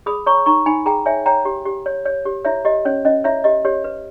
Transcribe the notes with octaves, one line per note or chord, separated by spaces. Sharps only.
G#4 B5 D#6
C#5 A#5 C#6
D#4 A#5 C#6
D#4 G#5 B5
G#4 G5 A#5
C#5 E5 G#5
C#5 G5 A#5
G4
G4
C#5
C#5
G4
E4 C#5 E5
G4 D#5
C#4 C#5
C#4 D#5
E4 C#5 E5
G4 D#5
G4 C#5
B4